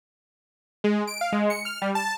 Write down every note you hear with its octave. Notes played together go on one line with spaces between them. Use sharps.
G#3
D7
F5
G#3
C#7
F6
G3
A5